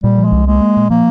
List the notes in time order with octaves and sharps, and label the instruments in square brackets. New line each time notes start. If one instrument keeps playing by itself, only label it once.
[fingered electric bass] A#2 [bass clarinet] G3
[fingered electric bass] F3
[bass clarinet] G#3
[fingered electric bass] C2
[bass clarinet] G#3 [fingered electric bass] A#3
[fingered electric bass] A#3
A#2
[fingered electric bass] F3 [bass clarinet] A#3